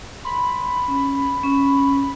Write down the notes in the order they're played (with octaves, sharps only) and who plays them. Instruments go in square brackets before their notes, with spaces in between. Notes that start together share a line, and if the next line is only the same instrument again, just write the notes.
[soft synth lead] B5 [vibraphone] C6
[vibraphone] C#4
C#4